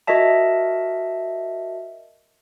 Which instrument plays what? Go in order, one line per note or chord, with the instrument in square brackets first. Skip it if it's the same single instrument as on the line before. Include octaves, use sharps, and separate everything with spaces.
[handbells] F#4 A#4 D#5 E5 A5